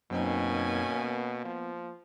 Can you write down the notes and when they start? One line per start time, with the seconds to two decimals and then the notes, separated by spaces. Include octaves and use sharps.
0.11 F#2 B2 A#3 C4 C#4 D#4 G#5
1.04 B3
1.45 F3